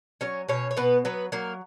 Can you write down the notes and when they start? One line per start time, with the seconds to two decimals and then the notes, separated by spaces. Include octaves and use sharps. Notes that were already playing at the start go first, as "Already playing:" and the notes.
0.21 F#3 C#4 C#5
0.49 B2 C#4 C#5
0.71 C#5
0.77 B2 B3 B4
1.05 F#3 B3 B4
1.32 F#3 A#3 A#4